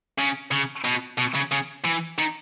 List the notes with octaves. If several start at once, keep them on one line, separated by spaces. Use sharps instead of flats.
C#3
C#3
B2
B2
C#3
C#3
E3
D#3